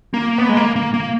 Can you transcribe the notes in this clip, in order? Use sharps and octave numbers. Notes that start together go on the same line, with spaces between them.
A#3
B3
G#3
A#3
A#3
A#3